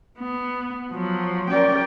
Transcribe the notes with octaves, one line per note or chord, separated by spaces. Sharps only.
B3
F3 F#3
C#4 A#4 D5 G5